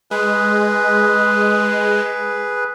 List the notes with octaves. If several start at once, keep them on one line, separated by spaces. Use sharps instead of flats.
G#3 G#4 B4